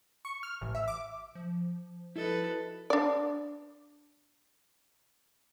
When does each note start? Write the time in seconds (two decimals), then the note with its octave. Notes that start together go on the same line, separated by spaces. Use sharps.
0.25 C#6
0.43 F6
0.61 A1
0.75 E5
0.88 D6
1.35 F3
2.16 E4 F#4 A4 B4 D#5
2.90 D4 D5